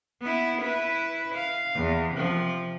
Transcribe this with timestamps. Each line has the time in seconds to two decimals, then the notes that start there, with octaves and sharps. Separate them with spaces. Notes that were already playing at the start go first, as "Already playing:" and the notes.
0.21 B3 E4
0.62 E4 B4
1.35 F5
1.76 E2
2.13 C3 F3